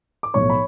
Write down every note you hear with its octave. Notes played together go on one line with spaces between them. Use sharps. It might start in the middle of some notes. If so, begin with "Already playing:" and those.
D6
B1 A2 F3 C#5 C#6
B5